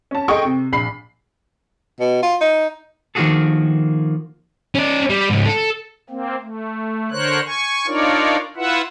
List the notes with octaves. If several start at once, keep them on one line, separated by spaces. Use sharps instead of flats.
C#4 A5
G#4 A4 D#5 G5 C#6
C3
A#1 B5 C7
B2
F4
D#4
D#3 F3 A#3 F#4 G#4 A4
C#4 D5
G3
G#2 C#3
A4
A#3 C4
A3
D3 A#4 C5 C#5 F#6
G#5 C#6
D4 D#4 F4 A#4 C#5 D5
E4 F4 B4 E5 F#5